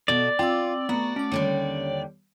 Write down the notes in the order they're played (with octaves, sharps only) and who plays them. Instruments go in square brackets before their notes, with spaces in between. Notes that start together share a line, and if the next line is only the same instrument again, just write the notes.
[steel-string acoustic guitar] B2 A4 [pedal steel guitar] D5
[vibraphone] C4 D6 E6 [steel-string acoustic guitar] F4 [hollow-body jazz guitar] G5
[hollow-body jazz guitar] A3 B3 [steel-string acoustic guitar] F#4 [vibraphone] A#5
[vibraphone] A3 D6 [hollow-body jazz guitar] C#4
[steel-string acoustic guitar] D#2 D3 G3 [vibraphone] C#5